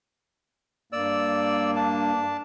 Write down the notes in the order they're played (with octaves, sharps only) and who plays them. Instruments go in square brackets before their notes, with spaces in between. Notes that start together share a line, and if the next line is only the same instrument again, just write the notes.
[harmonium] G2 A#3 [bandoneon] D5 E6
[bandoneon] D4 A5